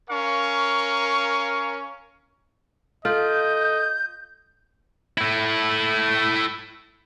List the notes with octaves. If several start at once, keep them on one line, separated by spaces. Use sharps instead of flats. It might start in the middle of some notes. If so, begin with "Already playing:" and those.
C#4 A#4 F5 C#6
F4 A4 D#5 G6
A3 E4